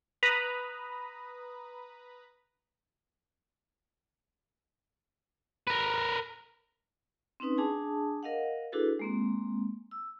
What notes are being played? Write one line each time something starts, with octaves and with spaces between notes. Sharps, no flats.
B4 A#5 B5 D#6
A#4 B4
C4 C#4 D#4 B4 D#6
D4 G#4 G#5 A5 D#6
A#4 D#5 F5 F#5
D4 E4 F#4 G#4 A4 B4
G#3 A#3 C4
E6